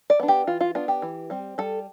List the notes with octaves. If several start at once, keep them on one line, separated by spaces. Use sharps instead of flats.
D5
B3 D4
G4
E3 F4
F4
B3 D4 F4
G4
E3
G3 C4
G3 A4